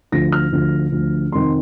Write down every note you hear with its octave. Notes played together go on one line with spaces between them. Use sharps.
D2 D3 F3 A#6
F6
D2 D3 F3
D2 D3 F3
F2 C3 D#3 C6